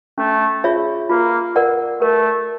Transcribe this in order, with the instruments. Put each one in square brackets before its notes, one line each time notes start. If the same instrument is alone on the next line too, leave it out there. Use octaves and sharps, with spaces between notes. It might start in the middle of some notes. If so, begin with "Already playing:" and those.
[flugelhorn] A3 [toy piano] C#4
[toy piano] F4 G#4 C#5 E5
[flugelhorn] A#3 [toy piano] F4
[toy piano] A#4 D5 F#5
[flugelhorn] A3 [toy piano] A#4